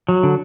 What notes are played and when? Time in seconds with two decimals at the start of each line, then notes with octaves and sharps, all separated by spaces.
0.08 F#3
0.23 D3